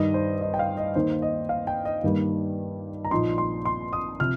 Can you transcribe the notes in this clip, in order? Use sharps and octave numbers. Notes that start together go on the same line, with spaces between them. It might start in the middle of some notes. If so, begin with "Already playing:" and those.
Already playing: G2 D#3 G3 D#4 D#5
C5
D#5
G5
F5
D#5
D#2 D#3 A#3 D#4 C5
D#5
F5
G5
D#5
G2 D#3 G3 A#3
A#5
A#1 A#2 F3 D#4 C6
C6
C6
D#6
C3 F3 F6